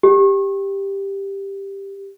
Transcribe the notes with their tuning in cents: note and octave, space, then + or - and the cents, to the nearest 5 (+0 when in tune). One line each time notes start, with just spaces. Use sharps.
G4 +5